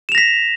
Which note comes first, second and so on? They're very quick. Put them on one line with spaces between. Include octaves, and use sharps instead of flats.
E7 F7 A#6 B6